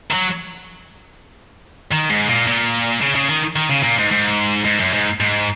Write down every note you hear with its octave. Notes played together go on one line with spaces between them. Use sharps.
D#3
F#3
D#3
G#2
A#2
A#2
C#3
C#3
D#3
D#3
C#3
A#2
G#2
G#2
G#2
F#2
G#2
G#2